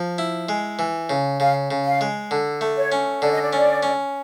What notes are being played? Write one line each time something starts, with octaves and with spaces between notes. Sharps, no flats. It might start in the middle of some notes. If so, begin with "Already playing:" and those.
Already playing: F3
E4
G#3
E3
C#3
C#3 F5
C#3
F5
G#3
D3
A3
C#5
C#4
D3 D5
D#5
D5
C#4
C#4